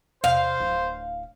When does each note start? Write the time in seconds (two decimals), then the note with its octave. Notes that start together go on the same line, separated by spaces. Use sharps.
0.24 E2 C3 C5 F5
0.60 D1 E4